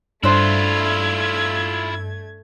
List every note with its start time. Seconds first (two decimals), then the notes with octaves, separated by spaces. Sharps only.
0.24 G2 A3 D4 E4 F4 C5 G#6